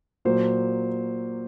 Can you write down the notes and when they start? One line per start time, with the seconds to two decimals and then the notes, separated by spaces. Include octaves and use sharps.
0.25 A#2 F#3 A#3 C5